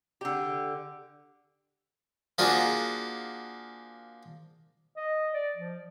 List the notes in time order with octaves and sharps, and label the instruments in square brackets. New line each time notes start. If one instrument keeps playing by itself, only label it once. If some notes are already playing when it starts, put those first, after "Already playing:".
[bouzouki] D3 G4
[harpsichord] F3 A#3 D4 F#4 G#4
[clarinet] D#5
D5
F3